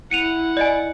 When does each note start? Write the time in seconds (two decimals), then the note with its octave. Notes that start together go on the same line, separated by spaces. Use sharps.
0.11 E4 F#5 C#7 D#7 F7
0.57 D5 D#5 G#5